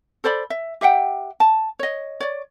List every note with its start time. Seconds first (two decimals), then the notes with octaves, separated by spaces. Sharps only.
0.24 A4 C5 D5 B5
0.50 E5
0.81 G4 E5 F#5 G5
1.40 A5
1.79 C#5 D#5
2.20 C#5 D5